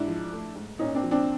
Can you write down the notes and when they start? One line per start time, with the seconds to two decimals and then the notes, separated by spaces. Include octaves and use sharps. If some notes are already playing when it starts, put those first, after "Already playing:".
Already playing: G#2 D4 E4
0.08 F3
0.33 A3
0.55 G#2
0.79 A#2 C#4 D#4
0.95 C4 D4
1.03 F3
1.11 C4 D4